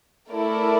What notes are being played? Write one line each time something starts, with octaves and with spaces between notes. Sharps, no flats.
A3 E4 A#4 D5